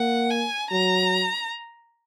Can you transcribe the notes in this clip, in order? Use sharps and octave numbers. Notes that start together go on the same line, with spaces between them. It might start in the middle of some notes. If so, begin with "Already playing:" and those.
Already playing: A#3 F#5
G#5
F#3 A#5